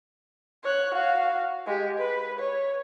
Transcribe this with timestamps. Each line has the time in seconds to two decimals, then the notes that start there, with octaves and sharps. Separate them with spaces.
0.64 C#5 F#6
0.94 F#4 F5
1.67 G#3 G4
1.98 B4
2.39 C#5